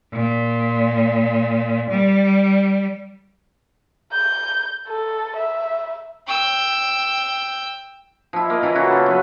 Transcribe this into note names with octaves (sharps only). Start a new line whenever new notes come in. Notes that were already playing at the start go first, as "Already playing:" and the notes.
A#2
G3
G6
A4
E5
G5 E6
F3 E4
A#3 D#5
C#3 E3 E4 A#5
C#3 F#4
C#3 F4 A4
F#3 C#4 B4